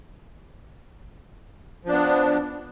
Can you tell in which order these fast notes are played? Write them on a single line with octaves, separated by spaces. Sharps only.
F3 D4 B3